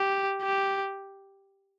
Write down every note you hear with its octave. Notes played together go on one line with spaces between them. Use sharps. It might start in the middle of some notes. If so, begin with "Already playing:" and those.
Already playing: G4
G4